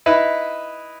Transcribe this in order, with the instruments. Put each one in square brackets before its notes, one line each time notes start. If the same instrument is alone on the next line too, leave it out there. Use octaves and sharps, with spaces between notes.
[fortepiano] D#4 E4 B4